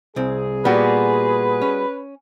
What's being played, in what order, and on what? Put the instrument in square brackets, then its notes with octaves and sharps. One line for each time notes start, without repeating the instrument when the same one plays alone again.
[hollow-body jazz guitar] C2 C4 [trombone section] G#4
[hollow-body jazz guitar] A#2 [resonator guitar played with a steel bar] G3 B3 F#4 [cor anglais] B4
[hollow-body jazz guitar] C#4